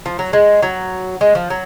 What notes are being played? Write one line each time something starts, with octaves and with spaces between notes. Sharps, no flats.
F3
F#3
G#3
F#3
G#3
F3
F#3